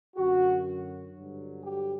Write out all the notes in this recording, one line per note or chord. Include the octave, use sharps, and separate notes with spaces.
F#2 D3 F#3 F#4
G2 D3 F#3
G4